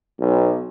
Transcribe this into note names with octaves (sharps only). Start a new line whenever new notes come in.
B1